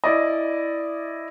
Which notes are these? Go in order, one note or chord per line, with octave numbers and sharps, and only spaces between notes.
E4 D5 D#5